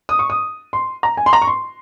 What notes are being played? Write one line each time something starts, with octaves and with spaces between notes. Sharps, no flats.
D#6
C#6
D#6
C6
A#5
G#5
C6
A#5
C#6
C6